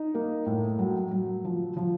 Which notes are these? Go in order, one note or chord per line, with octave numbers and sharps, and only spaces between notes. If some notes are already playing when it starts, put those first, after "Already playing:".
Already playing: D#4
A#3
A2
F#3
F#3
F3
F3